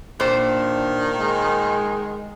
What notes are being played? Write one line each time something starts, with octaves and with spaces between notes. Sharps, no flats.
A#2 D#3 D4 C5
G#3